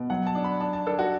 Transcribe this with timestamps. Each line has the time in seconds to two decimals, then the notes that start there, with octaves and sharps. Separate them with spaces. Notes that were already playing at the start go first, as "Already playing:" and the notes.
Already playing: B2
0.10 F#3 F#5
0.27 A5
0.35 D4
0.44 B5
0.60 D4 A5
0.73 A5
0.86 D4 A4
0.99 F#4